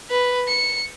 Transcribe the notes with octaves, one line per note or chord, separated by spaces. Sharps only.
B4
C#7